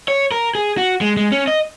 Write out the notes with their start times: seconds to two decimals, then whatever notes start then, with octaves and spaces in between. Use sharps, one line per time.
0.08 C#5
0.32 A#4
0.55 G#4
0.77 F#4
1.01 G#3
1.17 G#3
1.32 C#4
1.47 D#5